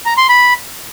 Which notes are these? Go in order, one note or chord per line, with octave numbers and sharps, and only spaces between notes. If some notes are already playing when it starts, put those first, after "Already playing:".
A#5
C6
B5